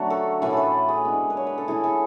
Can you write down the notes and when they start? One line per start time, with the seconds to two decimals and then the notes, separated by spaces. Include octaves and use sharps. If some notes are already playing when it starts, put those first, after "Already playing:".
Already playing: D3 F#3 A3 D4 F#4
0.10 A4
0.42 A2 E3 A3 B4
0.53 A4 B4
0.89 G#4
1.05 D3 G#3 B3
1.30 B4
1.37 C#5
1.47 B4
1.58 A4
1.68 E3 A3 E4 G#4
1.84 A4